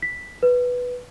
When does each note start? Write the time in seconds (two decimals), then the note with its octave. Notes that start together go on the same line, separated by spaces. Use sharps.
0.02 B6
0.43 B4